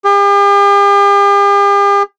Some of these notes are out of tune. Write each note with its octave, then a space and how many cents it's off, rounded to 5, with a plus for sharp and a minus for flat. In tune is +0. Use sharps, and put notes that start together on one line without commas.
G4 +45